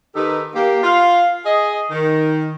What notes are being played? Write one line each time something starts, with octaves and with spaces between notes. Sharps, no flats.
D#3 D#4 G4 A4 B4
A#3 G4
F4 F5
G#4 D#5
D#3